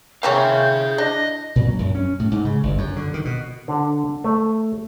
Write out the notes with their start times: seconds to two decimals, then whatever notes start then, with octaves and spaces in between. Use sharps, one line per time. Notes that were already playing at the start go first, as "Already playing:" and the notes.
0.23 A#3 C4 C#4 E4 G#4 F5 G6
0.98 D4 D#5 A#6
1.56 A#2
1.67 F#3
1.79 F#2
1.95 C#4
2.19 A2
2.31 G#2
2.45 C#3
2.63 G1
2.78 F#2
2.96 D3
3.14 D#3
3.25 B2
3.68 D3
4.24 A3